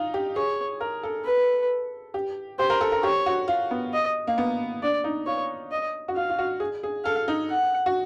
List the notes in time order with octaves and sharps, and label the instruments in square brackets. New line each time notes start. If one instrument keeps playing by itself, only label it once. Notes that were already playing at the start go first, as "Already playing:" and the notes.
Already playing: [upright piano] D#4 F4
G4
[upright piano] G#4 [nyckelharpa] C#5
[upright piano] A#4
A4
[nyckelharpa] B4
[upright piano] G4
[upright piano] G4 [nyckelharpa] C5
[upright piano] A#4
A4
A#4
[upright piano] G4 [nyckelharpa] C#5
[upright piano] F#4
F4
B3
[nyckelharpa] D#5
[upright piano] A#3
B3
[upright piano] D4 [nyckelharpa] D5
[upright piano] D#4
[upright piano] F4 [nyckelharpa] C#5
[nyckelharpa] D#5
[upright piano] F#4
[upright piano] F4 [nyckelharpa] F5
[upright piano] F4
F#4
G#4
G#4
[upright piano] A4 [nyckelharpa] F5
[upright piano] D#4
[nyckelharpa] F#5
[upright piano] F#4